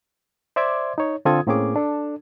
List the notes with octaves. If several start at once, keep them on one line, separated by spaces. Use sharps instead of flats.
C5 D5 E5 C6 D6 G#6
D#4 C#5
D3 C4 F4 A4 D#6 G#6
A2 A#3 C4 C#4 G#4 D6
D4 A4